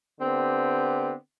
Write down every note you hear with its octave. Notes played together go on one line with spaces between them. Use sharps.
D3 B3 C4 G4